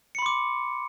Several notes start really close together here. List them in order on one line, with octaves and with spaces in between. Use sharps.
C#7 B5 C6 D6